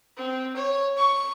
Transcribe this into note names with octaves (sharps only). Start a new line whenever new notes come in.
C4
C#5
C#6